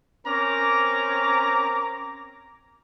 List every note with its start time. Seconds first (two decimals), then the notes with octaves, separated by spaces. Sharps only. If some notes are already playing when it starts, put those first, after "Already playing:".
0.27 C4 C#4 A#4 A#5 D6